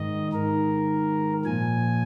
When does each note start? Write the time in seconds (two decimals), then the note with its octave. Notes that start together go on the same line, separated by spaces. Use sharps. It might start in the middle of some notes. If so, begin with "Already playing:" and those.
Already playing: G#2 D#3 D#5
0.33 G#2 D#3 A#4
1.45 A#2 F3 G#5